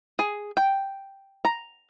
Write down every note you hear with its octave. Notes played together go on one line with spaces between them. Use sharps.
G#4
G5
A#5